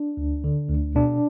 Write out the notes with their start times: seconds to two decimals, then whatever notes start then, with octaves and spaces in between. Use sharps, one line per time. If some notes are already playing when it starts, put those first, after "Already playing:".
Already playing: D4
0.17 D2
0.44 D3
0.69 D2
0.95 B2 D4